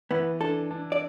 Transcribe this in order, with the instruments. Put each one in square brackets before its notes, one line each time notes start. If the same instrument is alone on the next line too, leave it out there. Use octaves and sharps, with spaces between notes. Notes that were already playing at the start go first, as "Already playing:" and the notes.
[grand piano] E3 [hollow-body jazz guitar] B3
[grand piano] D4 [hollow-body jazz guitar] A4
[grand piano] D4
[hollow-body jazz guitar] D5